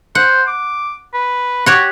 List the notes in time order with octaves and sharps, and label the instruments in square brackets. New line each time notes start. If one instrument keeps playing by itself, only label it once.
[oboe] C5 [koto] F#5
[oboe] D6
B4
[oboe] F#4 [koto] G4 C#5 F#5